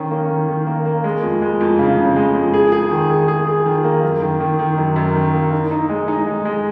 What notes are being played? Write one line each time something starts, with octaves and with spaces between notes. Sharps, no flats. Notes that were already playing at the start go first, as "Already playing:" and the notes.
Already playing: D#3 C#4
A#3
D#3
D#3
A#3
A#3
G#3
F2
G#3
F2
C#3
C#3
G#3
F2
G#4
G#4
D#3
G#4
G#4
G#4
D#3
A#3
F#2
D#3
D#3
D#3
F#2
F#2
D#3
A#3
D#4
D#4
G#3
D#4
G#3
G#3